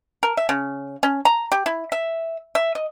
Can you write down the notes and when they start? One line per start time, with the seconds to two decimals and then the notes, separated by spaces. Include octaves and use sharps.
0.23 A#4
0.37 E5
0.49 C#3
1.03 C#4
1.25 A#5
1.52 G4
1.66 E4
1.92 E5
2.55 E5
2.75 D#5